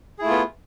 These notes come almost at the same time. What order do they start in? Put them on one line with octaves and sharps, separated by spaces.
G#4 E4 A3 F4 B3